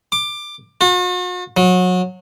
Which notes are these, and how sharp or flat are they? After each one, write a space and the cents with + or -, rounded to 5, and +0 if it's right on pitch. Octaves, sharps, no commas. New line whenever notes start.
D6 +15
F#4 -45
F#3 -25